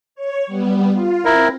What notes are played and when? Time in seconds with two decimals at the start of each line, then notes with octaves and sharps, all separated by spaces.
0.15 C#5
0.47 G3 B3
0.92 F4
1.25 C4 E4 A#4